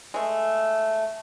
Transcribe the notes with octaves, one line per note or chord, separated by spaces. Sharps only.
G#3 A3